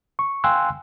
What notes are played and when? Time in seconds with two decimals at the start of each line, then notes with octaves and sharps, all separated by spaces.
0.19 C#6
0.44 F5 G5 G#5 C6 E6 F#6